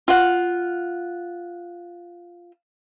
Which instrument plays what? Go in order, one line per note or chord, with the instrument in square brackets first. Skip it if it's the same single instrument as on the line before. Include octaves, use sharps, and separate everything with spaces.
[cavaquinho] F4 F#5